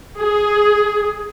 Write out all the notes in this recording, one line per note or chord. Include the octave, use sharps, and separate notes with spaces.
G#4